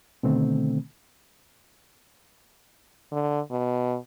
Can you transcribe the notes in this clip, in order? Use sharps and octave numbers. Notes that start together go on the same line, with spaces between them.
B2 D3 D#3 A3 C4
D3
B2